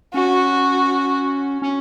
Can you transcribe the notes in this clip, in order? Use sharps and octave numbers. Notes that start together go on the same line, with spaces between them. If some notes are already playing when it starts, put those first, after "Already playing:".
C#4 F#4
C#4